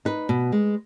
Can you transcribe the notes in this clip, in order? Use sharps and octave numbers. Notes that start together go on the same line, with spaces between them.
D#4 B4
B2
G#3